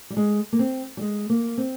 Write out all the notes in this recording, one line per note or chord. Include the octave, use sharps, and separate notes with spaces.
G3
G#3
A#3
C4
G3
G#3
A#3
C4